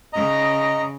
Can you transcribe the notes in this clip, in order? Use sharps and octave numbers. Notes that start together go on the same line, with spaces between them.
C#3 D#5 A#5